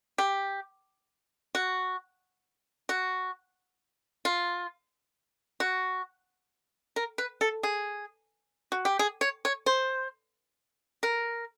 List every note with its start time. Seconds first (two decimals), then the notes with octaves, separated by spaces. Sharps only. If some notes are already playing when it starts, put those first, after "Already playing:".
0.18 G4
1.55 F#4
2.89 F#4
4.25 F4
5.60 F#4
6.96 A#4
7.18 B4
7.41 A4
7.63 G#4
8.72 F#4
8.85 G4
8.99 G#4
9.21 C#5
9.45 C#5
9.66 C5
11.03 A#4